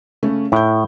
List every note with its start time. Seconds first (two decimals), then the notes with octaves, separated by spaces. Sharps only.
0.23 C#3 A3 C#4
0.52 A2 E4 G6